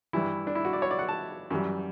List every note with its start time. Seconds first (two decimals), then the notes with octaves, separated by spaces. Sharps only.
0.13 G2 E3 G3 E4
0.47 D4
0.55 E4
0.65 F#4
0.73 D5
0.82 C#5
0.91 D5
0.99 F#5
1.08 A5
1.50 F#2 E3 G3